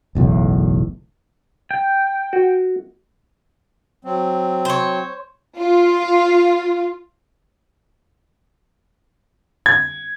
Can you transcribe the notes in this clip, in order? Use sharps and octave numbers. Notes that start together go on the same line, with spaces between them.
F#1 B1 E2 A2
G5
F#4
F#3 C4
C5 C#5
F4
G#6